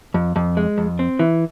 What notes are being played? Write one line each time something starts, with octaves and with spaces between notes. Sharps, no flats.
F2
F2
G#3
F2
C4
E3